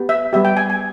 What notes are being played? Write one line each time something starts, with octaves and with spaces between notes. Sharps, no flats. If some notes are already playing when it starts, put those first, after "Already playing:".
Already playing: B3 G4
E5
G3 B3 G4 E5
G5
G#5
G#5